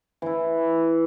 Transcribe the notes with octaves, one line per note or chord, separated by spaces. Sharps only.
E3 E4